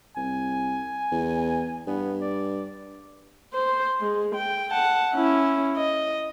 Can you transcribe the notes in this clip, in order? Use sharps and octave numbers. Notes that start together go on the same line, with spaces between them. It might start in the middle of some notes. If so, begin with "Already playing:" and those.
C2 G#5
E2
G2 B3
D5
C5
G#3
G5
F#5 A5
C#4 E4
D#5